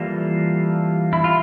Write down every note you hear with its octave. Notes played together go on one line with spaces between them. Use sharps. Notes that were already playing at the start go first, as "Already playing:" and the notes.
Already playing: E3 G3 A#3 F4 A4
E4
F4